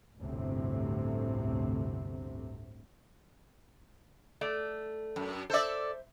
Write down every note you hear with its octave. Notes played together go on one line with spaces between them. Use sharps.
G1 D2 A2 C3 C4
A3 D5
F#2
A4 C5 D5 E5